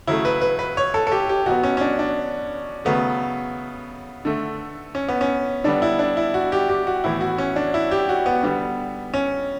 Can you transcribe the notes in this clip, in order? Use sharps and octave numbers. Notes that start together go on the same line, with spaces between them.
C#3 F#3 A3 E4
B4
B4
B4
C#5
A4
A4
G4
G4
B2 F#3 B3 F#4
C#4
C#4
D4
D4
C#3 F#3 A3 B3
D3 A3
C#4
B3
C#4
D3 G3 B3 D4
E4
D4
E4
F#4
G4
G4
F#4
A2 E3 B3 E4
F#4
C#4
D4
E4
G4
F#4
B3
D3 G3 B3
C#4